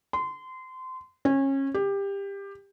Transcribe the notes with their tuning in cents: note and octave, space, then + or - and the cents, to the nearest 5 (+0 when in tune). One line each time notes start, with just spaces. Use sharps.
C6 -25
C#4 -25
G4 +20